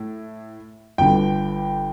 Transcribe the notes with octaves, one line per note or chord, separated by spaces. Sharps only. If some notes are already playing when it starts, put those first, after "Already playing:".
Already playing: A2
G1 G2 D3 G5